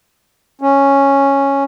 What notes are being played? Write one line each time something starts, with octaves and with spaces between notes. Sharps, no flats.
C#4